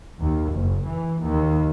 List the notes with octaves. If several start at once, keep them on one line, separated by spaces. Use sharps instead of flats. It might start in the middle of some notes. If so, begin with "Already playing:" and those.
D#2
F#1
E3
D#2